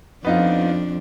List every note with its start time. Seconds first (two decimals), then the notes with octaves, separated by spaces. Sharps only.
0.25 F2 B3 D4 D#4 F4